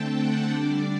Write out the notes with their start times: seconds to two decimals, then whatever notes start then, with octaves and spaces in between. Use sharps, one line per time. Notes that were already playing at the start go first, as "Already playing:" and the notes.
Already playing: D3 A3 C4 G5 A5
0.14 F#5
0.50 D3 G3 D4 D5